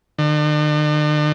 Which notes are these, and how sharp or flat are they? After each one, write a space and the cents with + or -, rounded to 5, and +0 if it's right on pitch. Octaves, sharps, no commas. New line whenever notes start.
D3 +45